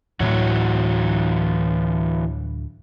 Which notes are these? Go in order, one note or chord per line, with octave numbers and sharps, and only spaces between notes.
D2 A2 E3 F#3 F#4 C#5